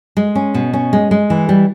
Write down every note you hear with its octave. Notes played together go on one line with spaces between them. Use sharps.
G#3
C#4
B2
C#4
G#3
G#3
E3
G3